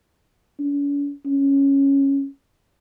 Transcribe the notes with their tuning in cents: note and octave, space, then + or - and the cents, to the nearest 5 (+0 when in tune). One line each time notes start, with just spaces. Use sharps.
C#4 +45
C#4 -5